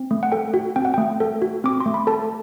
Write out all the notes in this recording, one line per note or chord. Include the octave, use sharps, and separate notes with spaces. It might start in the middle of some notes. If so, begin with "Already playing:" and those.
Already playing: C4
A3
F#5
A4 G5
F#4
C4 G5
F#5
A3 G5
A4
F#4
C4 D6
C6
A3
B5
A4 A5